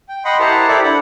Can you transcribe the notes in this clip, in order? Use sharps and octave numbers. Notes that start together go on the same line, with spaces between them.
G5
D#5 F#5 G5 B5 C6
E4 G4 A#4 C5 F#5 A5
E4 G4 A4 D5 E5
D4 F#5 B5